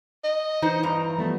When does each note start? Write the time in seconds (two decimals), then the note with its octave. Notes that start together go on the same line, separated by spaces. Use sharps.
0.24 D#5
0.62 E3 D#4 C5
0.83 E2 G2 A#5
1.18 F3 G3 A3 B3